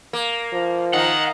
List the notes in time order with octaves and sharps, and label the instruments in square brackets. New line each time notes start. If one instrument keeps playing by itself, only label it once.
[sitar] A#3
[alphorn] F3
[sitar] D#3 [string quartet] D#5 F5 A#5 [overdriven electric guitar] F#5